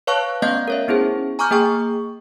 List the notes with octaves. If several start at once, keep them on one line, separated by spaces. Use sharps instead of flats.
B4 C#5 F5 A5 C#6 F#6
A3 B3 C#4 D#5 F5 G6
A#4 C#5 E5
B3 C#4 E4 G#4 C5
G#5 A#5 C#6 D6 F6 G6
A#3 G#4 G5 C#6